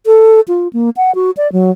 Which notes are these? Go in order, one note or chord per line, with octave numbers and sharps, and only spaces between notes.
A4
F4
A#3
F#5
F#4
D5
F#3